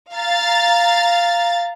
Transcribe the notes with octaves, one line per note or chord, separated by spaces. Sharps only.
F5 A#5 A6